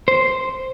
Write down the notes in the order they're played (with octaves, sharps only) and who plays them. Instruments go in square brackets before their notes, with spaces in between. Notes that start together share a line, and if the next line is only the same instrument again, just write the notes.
[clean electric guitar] C5